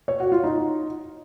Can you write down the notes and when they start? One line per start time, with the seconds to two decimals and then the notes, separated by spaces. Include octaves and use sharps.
0.08 C#5
0.20 F#4
0.32 F4
0.44 D#4